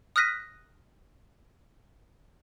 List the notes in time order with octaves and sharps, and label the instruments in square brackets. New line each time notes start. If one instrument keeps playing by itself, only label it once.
[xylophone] D#6 F6 F#6 A#6 B6 D#7